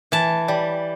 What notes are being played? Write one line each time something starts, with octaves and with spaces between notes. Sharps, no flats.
E3 A5
G3